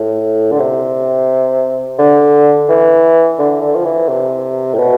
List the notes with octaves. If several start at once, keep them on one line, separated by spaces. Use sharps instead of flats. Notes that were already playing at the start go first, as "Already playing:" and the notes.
Already playing: A2
D3
C3
D3
E3
D3
D3
F3
E3
C3
A2
B2